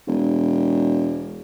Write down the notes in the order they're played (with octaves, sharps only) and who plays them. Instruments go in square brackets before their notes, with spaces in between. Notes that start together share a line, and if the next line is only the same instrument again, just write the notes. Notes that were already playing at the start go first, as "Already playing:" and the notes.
[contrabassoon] E1